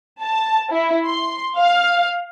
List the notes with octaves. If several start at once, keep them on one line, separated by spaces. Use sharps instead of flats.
A5
E4
C6
F5